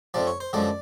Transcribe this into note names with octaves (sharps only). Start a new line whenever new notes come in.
F2 C3 F3 D5
C#5
C5
F#2 D3 F3 G#3 D5